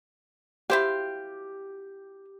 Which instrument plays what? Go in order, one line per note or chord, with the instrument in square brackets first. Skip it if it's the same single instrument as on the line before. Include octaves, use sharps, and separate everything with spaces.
[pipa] E4 C5 F5 [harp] G4